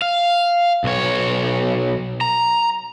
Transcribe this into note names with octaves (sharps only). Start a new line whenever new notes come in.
F5
B1 C#5
A#5